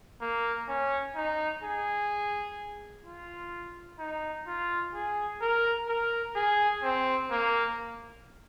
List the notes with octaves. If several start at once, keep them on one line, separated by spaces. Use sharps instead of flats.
A#3
C#4
D#4
G#4
F4
D#4
F4
G#4
A#4
A#4
G#4
C4
A#3